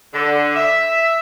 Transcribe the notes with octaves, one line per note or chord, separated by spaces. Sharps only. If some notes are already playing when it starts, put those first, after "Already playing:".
D3
E5